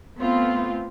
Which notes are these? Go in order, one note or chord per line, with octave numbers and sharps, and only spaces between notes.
A3 B3 C4 F4